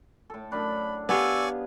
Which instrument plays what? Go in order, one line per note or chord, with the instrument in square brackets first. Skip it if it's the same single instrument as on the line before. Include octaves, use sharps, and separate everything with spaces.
[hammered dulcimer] A2 A4
[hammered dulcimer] F#2 D4 [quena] B5
[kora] B3 G4 F5 [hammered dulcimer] G#4 [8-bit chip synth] D5 G#5 C#6 [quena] E6